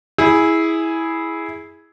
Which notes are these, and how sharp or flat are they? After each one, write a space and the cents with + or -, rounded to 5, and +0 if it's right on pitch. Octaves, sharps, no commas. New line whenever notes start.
E4 -10 G#4 +0